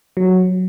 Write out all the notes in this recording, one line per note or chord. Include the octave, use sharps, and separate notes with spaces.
F#3